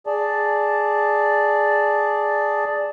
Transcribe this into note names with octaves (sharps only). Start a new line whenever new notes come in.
G#4 D5 A5